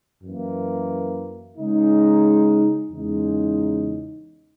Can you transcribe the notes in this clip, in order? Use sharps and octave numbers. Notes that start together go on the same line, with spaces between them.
F#2 E3 A#3
C#3 G#3 D#4
E2 C#3 G#3 D#4